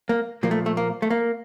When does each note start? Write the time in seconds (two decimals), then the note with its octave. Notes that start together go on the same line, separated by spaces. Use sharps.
0.09 A#3
0.43 A#2 F3 A#3
0.51 A3
0.66 A3
0.77 A#3
1.02 A3
1.10 A#3